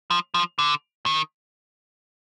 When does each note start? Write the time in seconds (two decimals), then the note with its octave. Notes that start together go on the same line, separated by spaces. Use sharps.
0.11 F3
0.34 F3
0.59 D3
1.06 D#3